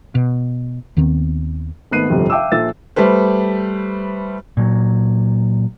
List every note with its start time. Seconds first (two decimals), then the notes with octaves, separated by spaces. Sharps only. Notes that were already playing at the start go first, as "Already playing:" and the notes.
0.15 B2
0.97 D#2 D#3 B3 C4
1.91 G#1 A3 B3 F#6 C7 D#7
2.10 G1 F2 C3 G4
2.30 E5 F5 G5 A5 D6 E6
2.52 A#1 A#2 A4 E5 E6 A6
2.96 G3 A3 B4 C5
4.57 A#2 F#3